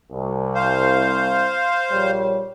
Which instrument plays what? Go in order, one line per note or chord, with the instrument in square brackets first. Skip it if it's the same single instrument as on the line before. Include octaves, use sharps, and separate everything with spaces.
[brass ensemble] C2
[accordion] C5 F5
[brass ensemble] A#1 G3 C#5